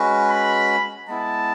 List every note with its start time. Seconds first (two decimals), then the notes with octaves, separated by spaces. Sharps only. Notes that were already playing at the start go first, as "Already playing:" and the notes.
Already playing: G#3 C#4 F#4 B4
0.30 B5
1.07 G#3 B3 E4 A5